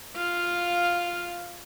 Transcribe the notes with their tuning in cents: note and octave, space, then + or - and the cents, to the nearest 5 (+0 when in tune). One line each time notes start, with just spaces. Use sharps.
F4 +0 F5 +0